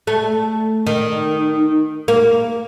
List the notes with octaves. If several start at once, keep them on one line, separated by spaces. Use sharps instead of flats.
A3
D#3
A#3